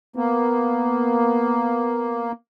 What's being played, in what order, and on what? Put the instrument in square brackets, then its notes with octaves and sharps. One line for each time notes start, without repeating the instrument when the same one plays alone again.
[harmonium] A#3 [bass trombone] B3